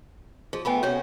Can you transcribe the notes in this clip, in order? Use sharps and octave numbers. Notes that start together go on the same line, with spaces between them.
F3 G#4
F3 A3 B3 G5 G#5 B5
C3 C#4 F#4 A4 C#5